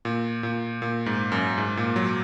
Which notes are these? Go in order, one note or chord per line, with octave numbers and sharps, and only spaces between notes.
A#2
A#2
A#2
G#2
F#2
G#2
A#2
F#3